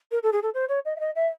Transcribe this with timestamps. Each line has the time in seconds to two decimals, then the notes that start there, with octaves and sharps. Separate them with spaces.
0.11 A#4
0.23 A4
0.32 G#4
0.42 A4
0.54 C5
0.68 C#5
0.85 D#5
0.96 E5
1.00 D#5
1.15 E5